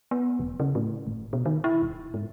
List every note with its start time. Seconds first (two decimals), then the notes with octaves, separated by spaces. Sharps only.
0.11 B3
0.39 E1
0.60 C#3
0.75 A2
1.07 G1
1.33 B2
1.46 D#3
1.64 E4
1.82 D1
2.14 G#2